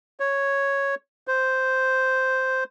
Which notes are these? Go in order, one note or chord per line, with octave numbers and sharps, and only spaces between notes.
C#5
C5